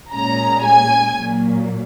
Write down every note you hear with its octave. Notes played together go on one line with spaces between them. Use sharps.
A#2 G#3 C#4 A#5
G#5
A#2 F#3 A#3